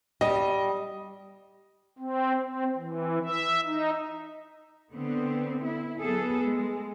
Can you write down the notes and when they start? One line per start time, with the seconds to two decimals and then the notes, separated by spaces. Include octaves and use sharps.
0.21 G3 D#5
1.98 C4
2.42 C4
2.77 E3
3.21 E5
3.65 D#4
4.94 D3 B3 C4
5.64 E4
6.01 F#3 B3 G#4 A4
6.43 G#3